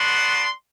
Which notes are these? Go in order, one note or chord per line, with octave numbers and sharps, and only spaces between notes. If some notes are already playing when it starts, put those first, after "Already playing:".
Already playing: B3 D4 F#4 C6